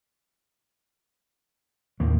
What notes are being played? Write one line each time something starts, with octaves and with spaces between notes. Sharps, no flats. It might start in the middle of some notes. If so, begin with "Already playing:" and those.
D#2 A2 C3 A#3